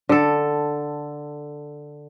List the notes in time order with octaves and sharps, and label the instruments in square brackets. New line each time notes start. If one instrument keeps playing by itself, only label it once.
[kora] D3 A4